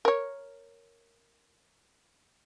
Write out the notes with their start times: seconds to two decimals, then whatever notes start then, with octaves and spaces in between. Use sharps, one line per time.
0.05 A#4 C#5